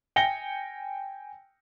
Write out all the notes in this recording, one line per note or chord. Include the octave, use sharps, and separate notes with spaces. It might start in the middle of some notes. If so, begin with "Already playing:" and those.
G5 G#5 A#6 C#7 G7